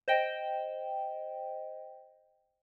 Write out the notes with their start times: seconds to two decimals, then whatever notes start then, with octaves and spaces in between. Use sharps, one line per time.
0.08 C5 D#5 G5